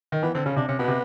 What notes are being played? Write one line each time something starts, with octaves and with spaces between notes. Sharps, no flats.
D#3
E3 B3
D3 C4
C#3 C#4
C3 D4
C3 C#4
B2 B3
C3